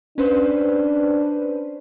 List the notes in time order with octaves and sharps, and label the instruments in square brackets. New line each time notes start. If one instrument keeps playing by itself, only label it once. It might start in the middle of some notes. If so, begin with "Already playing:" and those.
[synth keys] C#4 B4 C5 [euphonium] D4